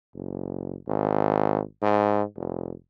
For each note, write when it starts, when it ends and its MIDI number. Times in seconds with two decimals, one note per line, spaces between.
0.14 0.76 30
0.88 1.61 32
1.82 2.22 44
2.36 2.73 29